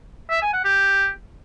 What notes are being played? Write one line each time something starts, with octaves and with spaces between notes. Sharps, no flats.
E5
G#5
F#5
G4